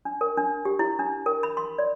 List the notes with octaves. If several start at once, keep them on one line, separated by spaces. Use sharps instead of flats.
D4
A#4
D4
G4
E4
D4
A#4
B5
C6
D5